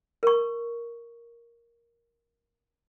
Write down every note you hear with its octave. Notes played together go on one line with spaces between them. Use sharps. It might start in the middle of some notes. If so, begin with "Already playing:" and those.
A#4 C#6